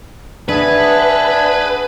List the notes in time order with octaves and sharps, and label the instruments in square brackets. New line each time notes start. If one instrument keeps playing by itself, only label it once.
[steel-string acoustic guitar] D4 [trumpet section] G#4 F#5 G#5 [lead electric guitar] B4 [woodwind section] E5 A5